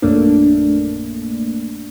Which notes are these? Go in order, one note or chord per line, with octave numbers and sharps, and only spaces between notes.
A#1 F#2 A3 A#3 D4